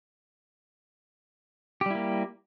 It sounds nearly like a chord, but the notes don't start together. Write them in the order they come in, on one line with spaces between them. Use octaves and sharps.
G4 G3 E4 A#3